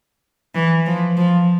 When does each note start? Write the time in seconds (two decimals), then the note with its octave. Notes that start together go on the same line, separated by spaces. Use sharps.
0.55 E3
0.86 F3
1.17 F3